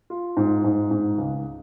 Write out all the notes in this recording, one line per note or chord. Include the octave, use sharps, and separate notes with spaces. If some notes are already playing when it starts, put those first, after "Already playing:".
F4
G#2
G#2
G#2
C#2